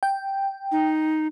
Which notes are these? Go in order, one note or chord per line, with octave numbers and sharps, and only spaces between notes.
G5
D#4